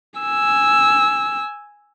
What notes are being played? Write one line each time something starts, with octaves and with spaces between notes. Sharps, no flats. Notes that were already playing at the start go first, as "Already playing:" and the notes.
G#5 E6